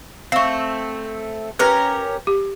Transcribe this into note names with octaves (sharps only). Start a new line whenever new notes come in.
A3 C4 F5 C#6
C#4 G4 A#4 B4
G4